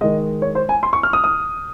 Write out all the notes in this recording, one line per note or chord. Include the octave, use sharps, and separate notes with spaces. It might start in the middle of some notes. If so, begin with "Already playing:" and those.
D#3 G#3 D#5
C#5
C5
G#5
C6
C#6
F6
D#6
D#6